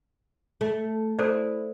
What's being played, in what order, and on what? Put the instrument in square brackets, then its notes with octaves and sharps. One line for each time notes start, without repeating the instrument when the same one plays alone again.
[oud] A3
[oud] E4 [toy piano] A4 C5 D5